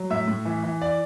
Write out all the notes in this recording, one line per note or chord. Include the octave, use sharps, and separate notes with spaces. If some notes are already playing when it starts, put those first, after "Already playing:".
Already playing: F#3
A2 E5
A2
E3
E3
D5